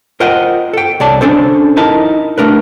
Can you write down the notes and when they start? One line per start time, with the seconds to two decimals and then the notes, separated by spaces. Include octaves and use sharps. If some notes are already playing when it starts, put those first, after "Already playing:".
0.20 F4 A#4 C5 D#5 F#5 G5
0.73 A4 G5
1.00 C2 C#5 D5 A5
1.21 C#4 D4 A4 C5
1.77 D#4 E4 A#4 D#5 A5
2.38 A3 D4 A#4 B4